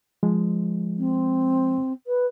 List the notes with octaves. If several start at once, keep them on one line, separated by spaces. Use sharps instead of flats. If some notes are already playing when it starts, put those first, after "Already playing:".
F3 G#3
C4
B4